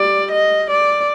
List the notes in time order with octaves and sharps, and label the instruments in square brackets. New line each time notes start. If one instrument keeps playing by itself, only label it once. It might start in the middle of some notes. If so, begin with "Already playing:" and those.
Already playing: [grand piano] G3 [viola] D5
[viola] D#5
D5